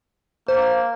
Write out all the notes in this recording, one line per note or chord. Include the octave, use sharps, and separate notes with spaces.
A#3 C5